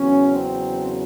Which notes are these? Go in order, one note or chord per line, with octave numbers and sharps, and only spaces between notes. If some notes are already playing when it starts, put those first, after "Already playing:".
Already playing: E2 C#3 F#3 C#4
C4